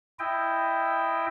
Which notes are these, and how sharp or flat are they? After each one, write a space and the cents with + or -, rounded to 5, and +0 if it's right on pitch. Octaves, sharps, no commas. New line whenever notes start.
E4 +5 D#5 +0 G5 +5